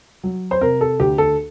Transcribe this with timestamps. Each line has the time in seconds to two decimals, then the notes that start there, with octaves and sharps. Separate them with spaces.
0.24 F#3
0.51 C5
0.61 C3 A#4
0.81 A4
1.00 D2 G4
1.18 A4